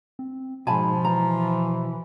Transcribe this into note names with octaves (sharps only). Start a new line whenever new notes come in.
C4
G#2 B2 F3 G#5 A5 B5
E3 A#5